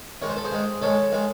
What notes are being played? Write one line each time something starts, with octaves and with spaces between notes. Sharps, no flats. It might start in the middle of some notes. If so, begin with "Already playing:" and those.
D#3 G#3 C#5
C5
A4
G#4 C5
D#3 G#3
D#3 G#3 A4 C#5
D#3 G#3